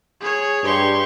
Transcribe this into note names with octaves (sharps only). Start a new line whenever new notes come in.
G#4 C#5
G2 G4 C6 C#6